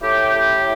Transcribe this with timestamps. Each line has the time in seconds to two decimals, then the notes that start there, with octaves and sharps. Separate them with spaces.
0.01 A2 E4 G4
0.34 A2